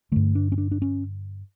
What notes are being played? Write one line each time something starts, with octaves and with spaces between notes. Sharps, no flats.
G2 D3 A3
D4
C#4
D4
D4
C#4